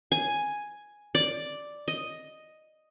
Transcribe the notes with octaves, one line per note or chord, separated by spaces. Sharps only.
G#5
D5
D#5